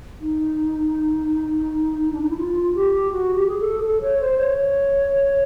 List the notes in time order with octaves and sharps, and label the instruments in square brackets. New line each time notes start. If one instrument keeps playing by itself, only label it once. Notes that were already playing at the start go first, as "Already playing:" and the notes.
[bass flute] D#4
D4
D#4
E4
F4
G4
F#4
G4
G#4
A4
A4
C#5
C5
C#5
C#5